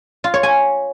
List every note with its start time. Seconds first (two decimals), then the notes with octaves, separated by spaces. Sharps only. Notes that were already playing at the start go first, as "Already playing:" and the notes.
0.24 F4
0.34 C#5
0.43 G#5